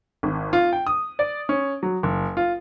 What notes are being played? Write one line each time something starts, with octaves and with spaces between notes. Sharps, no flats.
G#1
F4
G5
D#6
D5
C#4
F#3
F#1
F4